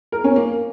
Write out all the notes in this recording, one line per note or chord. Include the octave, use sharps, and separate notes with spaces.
A#4
C#4
A#3